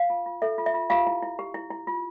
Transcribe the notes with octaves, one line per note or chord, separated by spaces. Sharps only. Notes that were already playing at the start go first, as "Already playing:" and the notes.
Already playing: F5
F4
F4
A4 E5
F4
E5
F4
F4 G4 F5
E4
E4
G4
E4
E4
F4